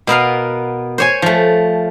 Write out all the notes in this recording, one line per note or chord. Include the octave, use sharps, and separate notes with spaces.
B2 B3 A#4 F5
C5 C#5 G#5
F3 A3